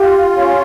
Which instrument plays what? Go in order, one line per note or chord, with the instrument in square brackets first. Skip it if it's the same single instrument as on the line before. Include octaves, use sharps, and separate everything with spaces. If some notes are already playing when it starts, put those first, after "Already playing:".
Already playing: [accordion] F4 [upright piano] G4
[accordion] C#4